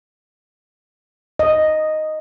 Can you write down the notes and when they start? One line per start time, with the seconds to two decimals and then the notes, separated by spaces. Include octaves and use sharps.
1.39 D#5